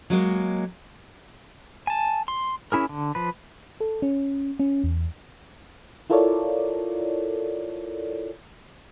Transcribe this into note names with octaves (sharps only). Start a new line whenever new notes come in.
F#3 G#3 A#3
G#5 A5
C6
C#4 E4 G#4 A#4
D3
F3 B4
A4
C#4
C#4
E2
E4 F4 A4 A#4 C#5 D5